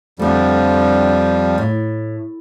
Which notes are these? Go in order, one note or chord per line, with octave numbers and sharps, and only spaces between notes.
F2 D3 F3 G3 A3
A2